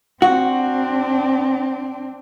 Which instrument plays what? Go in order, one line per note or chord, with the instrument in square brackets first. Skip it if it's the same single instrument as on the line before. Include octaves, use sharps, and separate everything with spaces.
[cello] C4 D4 [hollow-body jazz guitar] F#4